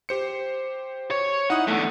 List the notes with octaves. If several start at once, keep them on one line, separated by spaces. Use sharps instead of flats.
G4 C5 C#7
C#5
D#4 E4 F#5 D#6
E2 D3 A3